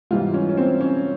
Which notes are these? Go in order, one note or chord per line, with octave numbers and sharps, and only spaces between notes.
G#2 E3 G3 F4
C#4
C#4
C4
C#4